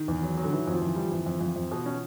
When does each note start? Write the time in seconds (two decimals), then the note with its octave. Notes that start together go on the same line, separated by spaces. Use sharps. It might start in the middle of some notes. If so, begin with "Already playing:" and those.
Already playing: D#3
0.08 E2
0.23 F#3
0.37 F#3
0.43 D3
0.52 D#3 E3
0.67 F2 F3
0.82 F2 E3
0.96 G3
1.12 F2 E3
1.26 F2
1.41 F2
1.56 F2
1.72 B2
1.86 C#4